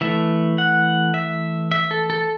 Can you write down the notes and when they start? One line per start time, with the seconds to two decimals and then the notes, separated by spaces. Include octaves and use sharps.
0.01 E3 A3 E5
0.58 F#5
1.14 E5
1.71 E5
1.91 A4
2.10 A4